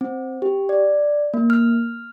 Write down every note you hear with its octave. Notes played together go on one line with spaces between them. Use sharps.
C4
G4
D5
A#3
F6